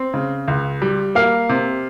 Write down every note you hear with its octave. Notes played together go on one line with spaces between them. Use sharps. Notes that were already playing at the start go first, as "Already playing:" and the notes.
Already playing: C4
C#3
C#2
G3
A#3 F5
C3